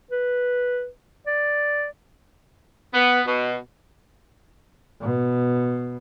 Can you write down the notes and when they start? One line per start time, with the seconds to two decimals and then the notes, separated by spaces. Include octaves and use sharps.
0.11 B4
1.27 D5
2.94 B3
3.27 B2
5.01 B2